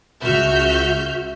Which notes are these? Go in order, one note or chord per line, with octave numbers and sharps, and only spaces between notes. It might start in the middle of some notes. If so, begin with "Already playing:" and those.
C#2 F#4 E5 F6 G6